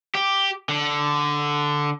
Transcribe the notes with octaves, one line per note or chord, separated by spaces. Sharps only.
G4
D3